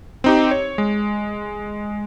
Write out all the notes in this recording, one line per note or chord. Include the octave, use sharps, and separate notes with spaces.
C4 D#4 G4
C#5
G#3